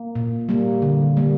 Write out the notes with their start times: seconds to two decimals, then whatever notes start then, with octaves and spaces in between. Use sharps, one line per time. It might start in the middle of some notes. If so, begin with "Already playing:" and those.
Already playing: A#3
0.16 A#2
0.49 G3 A#3
0.82 D3
1.17 G3 A#3